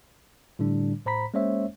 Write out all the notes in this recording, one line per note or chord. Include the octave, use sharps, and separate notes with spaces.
A2 D3 G3 D4
A2 C5 A#5 B5 B6
G#3 A#3 C#4 C5 C#5 E5